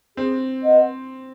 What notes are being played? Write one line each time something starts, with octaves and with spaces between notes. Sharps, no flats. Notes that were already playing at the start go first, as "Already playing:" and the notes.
C4 G#4
B4 D#5 F#5